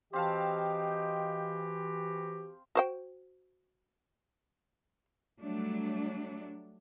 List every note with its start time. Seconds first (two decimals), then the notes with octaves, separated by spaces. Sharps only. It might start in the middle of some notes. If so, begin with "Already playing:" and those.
0.13 E3 C4 F#4 G4 D#5 F5 G5 A5
2.75 F#4 C5 G5
5.40 F#3 G3 A3 D4